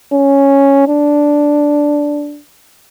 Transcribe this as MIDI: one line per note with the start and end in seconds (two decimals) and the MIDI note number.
0.12 0.86 61
0.88 2.39 62